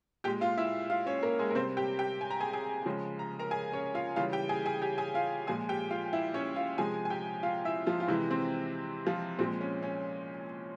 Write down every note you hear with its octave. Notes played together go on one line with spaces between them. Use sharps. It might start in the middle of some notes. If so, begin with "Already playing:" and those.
A#2 G#3 G4 G5
F4 F5
E4 E5
F4 F5
C#4 C#5
A#3 A#4
G#3 G#4
A#4
C3 G3 C4 C5
G4 G5
G4 G5
G#5
A#5
G#4 G#5
G#4 G#5
C#3 F3 G#3
A#5
A#4 A#5
G#4 G#5
C#4 C#5
F4 F5
C#3 E3 G3 F4 F5
G4 G5
G#4 G#5
G#4 G#5
G4 G5
G#4 G#5
F4 F5
A#2 F3 G#3 G#4 G#5
G4 G5
F4 F5
E4 E5
C#4 C#5
F4 F5
C3 F3 G#3 G#4 G#5
G#5
G4 G5
F4 F5
E4 E5
F3 F4
F4
C3 E3 G#3 E4
C4
F3 F4
A#2 F3 G#3 C4
C#4
C#4